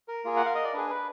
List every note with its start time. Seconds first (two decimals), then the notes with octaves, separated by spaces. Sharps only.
0.08 A#4
0.25 A#3 F4 G#4
0.37 F#5
0.46 F5
0.55 D#5
0.64 D5
0.74 D4 G#4 B4
0.90 B4